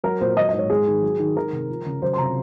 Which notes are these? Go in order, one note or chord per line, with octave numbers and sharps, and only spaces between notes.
F#3 A#4
A#2 C5
F#3 D#5
G#2 D#5
C#5
G#3 G#4
D#3
F#3
D#3
D#3 A#4
C3
F3
C#3
F#3 C5
C6
C3 A#5